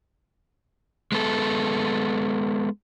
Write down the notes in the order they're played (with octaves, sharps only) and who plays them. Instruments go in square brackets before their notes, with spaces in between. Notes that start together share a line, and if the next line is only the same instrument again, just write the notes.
[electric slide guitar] G#3 B3 A4